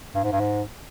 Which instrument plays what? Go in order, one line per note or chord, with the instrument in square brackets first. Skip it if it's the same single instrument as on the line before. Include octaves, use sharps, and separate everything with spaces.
[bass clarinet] G2
G#2
G2
G#2